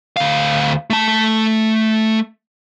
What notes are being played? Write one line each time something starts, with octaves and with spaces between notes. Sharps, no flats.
D2 F5
A3 A5